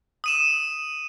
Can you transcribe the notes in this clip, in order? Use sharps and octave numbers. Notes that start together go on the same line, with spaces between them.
D#6 D#7 E7